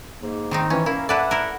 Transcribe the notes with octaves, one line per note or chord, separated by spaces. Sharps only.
G#2 A#3
D#3 C4 D#4
E3 C#4
A#3 C#4 E4
E4 A4 B4 D5 E5 F#5
E4 A#4